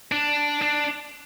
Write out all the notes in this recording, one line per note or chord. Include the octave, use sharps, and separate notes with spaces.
D4
D4